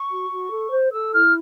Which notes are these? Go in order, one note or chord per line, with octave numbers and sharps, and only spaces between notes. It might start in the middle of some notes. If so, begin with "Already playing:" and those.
Already playing: C#6
F#4
F#4
A4
C5
A4 E6
E4 F6